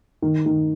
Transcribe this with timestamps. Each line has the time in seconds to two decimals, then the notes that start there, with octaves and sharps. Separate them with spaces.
0.22 D#3
0.46 D#3